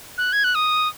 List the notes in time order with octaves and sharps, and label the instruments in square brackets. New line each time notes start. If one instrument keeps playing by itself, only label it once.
[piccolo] F#6
G#6
F#6
D#6